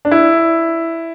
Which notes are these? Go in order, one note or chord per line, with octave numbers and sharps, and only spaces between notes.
D4
E4